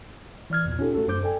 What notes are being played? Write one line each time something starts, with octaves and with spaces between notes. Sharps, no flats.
E3 D5 F6 G#6
B1 E2 A#2
C#4 D#4 F4 G4 A4
A3 F#4 A4
F#2 D4 C5 D6 G6
A4 D5 G5 G#5